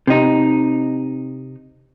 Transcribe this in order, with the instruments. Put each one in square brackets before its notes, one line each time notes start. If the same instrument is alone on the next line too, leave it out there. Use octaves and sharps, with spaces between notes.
[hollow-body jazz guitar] C3 D#4